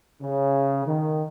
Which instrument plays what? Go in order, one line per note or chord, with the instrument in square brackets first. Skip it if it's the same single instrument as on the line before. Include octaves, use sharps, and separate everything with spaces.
[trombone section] C#3
D#3